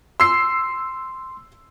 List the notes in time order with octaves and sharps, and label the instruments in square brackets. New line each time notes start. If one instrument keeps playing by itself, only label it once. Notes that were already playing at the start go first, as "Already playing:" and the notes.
[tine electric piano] C6 [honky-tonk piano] E6 C7